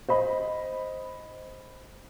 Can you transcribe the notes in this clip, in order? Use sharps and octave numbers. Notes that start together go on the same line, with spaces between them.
C5 D#5 B5